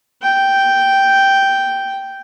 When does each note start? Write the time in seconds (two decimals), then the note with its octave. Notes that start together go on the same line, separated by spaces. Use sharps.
0.23 G5